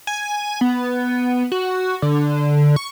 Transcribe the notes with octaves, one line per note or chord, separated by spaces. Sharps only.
G#5
B3
F#4
D3
C#6